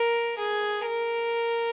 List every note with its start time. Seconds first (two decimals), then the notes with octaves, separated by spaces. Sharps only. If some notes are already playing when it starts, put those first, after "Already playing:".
Already playing: A#4
0.38 G#4
0.85 A#4